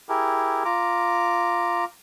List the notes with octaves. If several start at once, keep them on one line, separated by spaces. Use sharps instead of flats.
E4 G4 G#4 A#4
F4 A#5 D6